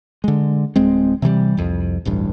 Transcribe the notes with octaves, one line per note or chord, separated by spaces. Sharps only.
D3 G#3
D1 G#3 C4
C3 E3 F#3 G3
C2 F2
D1 A1 G2